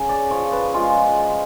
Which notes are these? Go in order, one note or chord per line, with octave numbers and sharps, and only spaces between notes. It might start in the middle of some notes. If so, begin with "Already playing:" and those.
Already playing: C#3
D5
F3 C#5
B4
G#3 F4